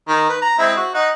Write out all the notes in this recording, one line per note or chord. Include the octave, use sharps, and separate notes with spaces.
D#3
B4
A#5
G#3 C4 E4
F#4
D#4 F#5